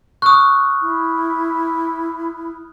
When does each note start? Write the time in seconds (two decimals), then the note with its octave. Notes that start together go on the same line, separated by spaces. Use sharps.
0.22 C#6 D#6 F6 F#6
0.82 E4